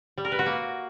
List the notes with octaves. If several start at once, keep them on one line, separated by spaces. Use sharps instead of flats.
G3
A#4
B4
F#4
A#3